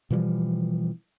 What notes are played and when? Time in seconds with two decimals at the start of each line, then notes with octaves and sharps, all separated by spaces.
0.10 B2 E3 F3 G3